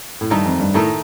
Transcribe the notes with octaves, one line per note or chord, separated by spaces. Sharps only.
A2
G2 D#3 A3 D#4 A#4
F2
G2
A2 D#3 A3 D#4 A#4